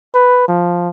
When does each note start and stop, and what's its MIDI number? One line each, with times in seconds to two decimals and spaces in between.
0.14 0.47 71
0.48 0.89 53